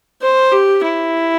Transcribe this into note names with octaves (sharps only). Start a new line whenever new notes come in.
C5
G4
E4